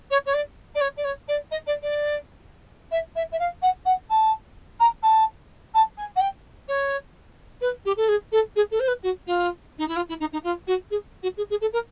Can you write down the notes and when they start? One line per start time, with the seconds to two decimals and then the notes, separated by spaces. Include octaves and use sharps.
0.10 C#5
0.26 C#5
0.33 D5
0.74 D5
0.80 C#5
0.96 D5
1.04 C#5
1.28 D5
1.51 D#5
1.66 D5
1.82 D5
2.91 E5
3.15 E5
3.32 E5
3.39 F5
3.62 F#5
3.85 F#5
4.10 A5
4.80 A#5
5.03 A5
5.74 A5
5.97 G#5
6.16 F#5
6.20 G5
6.68 C#5
7.61 B4
7.85 G4
7.97 A4
8.08 G#4
8.32 A4
8.56 G#4
8.71 A4
8.80 C5
8.88 B4
9.03 F#4
9.26 F4
9.78 D#4
9.88 E4
9.96 F4
10.08 E4
10.20 D#4
10.32 D#4
10.43 F4
10.67 F#4
10.91 G#4
11.22 F#4
11.37 G#4
11.50 G#4
11.61 A4
11.73 A#4